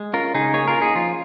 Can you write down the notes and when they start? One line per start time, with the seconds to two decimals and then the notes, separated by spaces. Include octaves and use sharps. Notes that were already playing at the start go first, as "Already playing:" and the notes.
Already playing: G#3
0.13 C#4 F4 A#4
0.34 C#3 D#4 G#4
0.54 A#3 G#4 C#5
0.68 F4 A#4
0.74 C#4
0.81 D#4 G#4
0.95 F3 F4